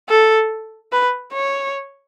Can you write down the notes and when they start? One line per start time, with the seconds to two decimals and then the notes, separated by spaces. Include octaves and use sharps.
0.09 A4
0.92 B4
1.33 C#5